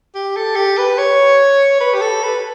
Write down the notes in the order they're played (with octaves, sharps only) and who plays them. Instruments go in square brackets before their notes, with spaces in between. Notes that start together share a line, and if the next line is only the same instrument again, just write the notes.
[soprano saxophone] G4
A4
G4
B4
C#5
B4
G4
A4
B4